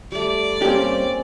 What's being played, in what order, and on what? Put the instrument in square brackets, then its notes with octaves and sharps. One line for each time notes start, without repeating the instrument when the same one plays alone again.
[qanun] G3 A3 [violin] D5
[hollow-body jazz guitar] G2 G4 [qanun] A#3 C4 [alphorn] C#4